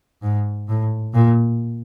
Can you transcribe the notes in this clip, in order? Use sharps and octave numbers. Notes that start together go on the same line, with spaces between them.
G#2
A2
A#2